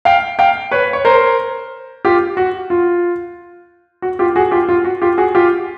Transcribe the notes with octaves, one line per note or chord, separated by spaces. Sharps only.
F5 G5
F5 G5
B4 C#5
C#5
A#4 C5
F4 G4
F#4
F4
F#4
F4 G4
F#4 G#4
F4 G4
F4
F#4
F4 G4
F#4 G#4
F4 G4